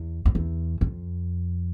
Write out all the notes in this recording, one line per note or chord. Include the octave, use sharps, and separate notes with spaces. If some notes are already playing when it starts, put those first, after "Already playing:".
Already playing: E2
F2
E2
F2